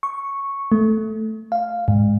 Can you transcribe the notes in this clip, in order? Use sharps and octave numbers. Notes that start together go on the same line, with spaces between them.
C#6
A3
F5
G#2